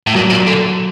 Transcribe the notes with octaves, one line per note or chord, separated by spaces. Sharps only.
A2
A#2 F#3
A#2
D3